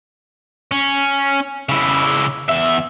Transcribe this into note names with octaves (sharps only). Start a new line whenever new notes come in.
C#4
C#3 E4
E2 E5